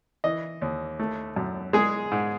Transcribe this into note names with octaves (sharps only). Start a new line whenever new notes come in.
E3 D#5
D#2
A3
F#2
G#3 G#4
G#2